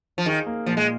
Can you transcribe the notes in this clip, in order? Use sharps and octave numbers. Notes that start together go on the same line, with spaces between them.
F3
D#3 G#4
A#3
A#2 F3
G#3